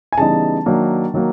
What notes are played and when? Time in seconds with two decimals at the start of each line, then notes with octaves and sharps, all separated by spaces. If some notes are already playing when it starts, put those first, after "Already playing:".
0.12 G#5
0.17 C#3 E3 G3 B3 D#4 A5
0.66 D#3 F#3 A#3 D4
1.14 D#3 F#3 A#3